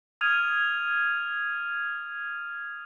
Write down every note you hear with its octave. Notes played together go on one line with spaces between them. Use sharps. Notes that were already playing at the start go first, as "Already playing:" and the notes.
D#6 F6 G#6 D#7 F7